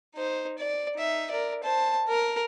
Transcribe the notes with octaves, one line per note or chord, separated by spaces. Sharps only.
D#4 C5
D5
D#4 E5
A#4 D5
C5 A5
A#4